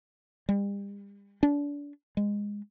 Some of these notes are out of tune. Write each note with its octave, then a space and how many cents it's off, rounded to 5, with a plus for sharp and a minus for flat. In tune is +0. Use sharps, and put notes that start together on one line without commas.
G3 +40
D4 -30
G#3 -15